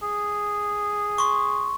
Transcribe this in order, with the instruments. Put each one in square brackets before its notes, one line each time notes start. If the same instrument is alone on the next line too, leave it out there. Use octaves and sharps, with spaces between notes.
[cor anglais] G#4
[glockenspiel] C6 C#6